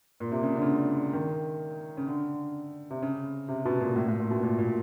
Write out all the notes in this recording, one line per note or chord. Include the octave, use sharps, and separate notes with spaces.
A#2
C3
C#3
D3
C#3
D3
D#3
C#3
D3
C3
C#3
C3
B2
A#2
A2
A2
A#2
B2
A#2
A#2